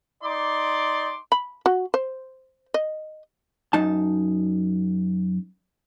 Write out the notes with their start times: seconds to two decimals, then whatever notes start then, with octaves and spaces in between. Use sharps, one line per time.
0.23 D#4 D5 C6 D6
1.32 B5
1.66 F#4
1.94 C5
2.74 D#5
3.73 F#2 D#4 A5